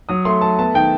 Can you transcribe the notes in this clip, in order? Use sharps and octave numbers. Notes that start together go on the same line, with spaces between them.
F#3 D#6
A3 C6
A3 A5
B3 A5
D#3 G5